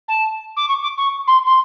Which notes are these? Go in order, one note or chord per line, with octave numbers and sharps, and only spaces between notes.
A5
D6
C#6
D6
C#6
C6
C6